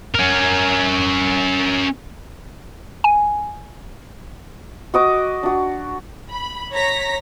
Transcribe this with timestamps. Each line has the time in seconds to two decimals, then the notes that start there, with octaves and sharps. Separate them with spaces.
0.15 C#4 A#4
3.04 G#5
4.94 F#4 D#5 D6
5.43 D4 F#4
6.29 B5
6.73 C#5 A#5 A#6 B6